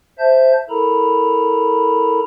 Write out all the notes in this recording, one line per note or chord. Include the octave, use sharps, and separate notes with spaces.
C5 E5 A5 G6
E4 A4 A#4 A#5 B5